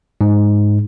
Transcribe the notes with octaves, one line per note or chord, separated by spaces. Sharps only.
G#2